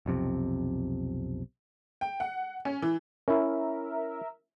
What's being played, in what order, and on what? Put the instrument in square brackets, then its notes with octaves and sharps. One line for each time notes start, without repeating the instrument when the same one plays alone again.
[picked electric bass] B1 F2 C3
[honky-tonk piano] G5
F#5
C#4
E3
[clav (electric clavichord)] C#4 E4 [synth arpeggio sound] A#4 E5